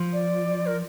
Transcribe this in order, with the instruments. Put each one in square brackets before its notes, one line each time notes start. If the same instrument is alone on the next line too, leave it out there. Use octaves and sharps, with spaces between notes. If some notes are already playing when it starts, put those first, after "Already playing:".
Already playing: [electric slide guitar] F3
[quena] D5
A#4